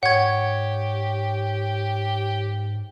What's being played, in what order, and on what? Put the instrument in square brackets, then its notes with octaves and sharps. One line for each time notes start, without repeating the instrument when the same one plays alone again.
[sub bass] G#2 [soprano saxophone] G4 [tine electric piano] C#5 C#6 [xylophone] F#5 G#6